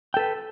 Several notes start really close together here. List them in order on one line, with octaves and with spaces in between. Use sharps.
G5 A4 B4